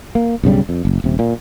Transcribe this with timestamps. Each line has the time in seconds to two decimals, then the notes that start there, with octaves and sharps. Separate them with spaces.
0.15 A#3
0.44 B1 G2 C#3 G3
0.69 F2
0.85 F#1
1.04 D#1 C3
1.19 A#2